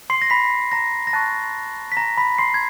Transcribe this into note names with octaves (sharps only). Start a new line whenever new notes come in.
C6 C7
A#6
B5 B6
A#5 A#6
A#6
A5 C#6 F#6 A6
B6
A#5 A#6
B5 B6
C6 C7
G#6